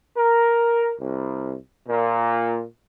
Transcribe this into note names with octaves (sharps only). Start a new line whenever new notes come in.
A#4
C2
A#2